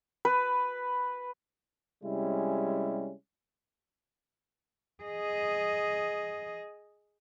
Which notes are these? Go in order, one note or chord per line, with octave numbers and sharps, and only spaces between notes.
B4
C3 G3 G#3 C#4 E4
G#4 D#5